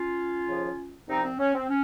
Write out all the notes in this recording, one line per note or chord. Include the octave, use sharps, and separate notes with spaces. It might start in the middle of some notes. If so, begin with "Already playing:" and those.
Already playing: C#4 F4
D#2 C#3 F3
C2 C3 F3 C4 D#4
C4
C#4
C4
C#4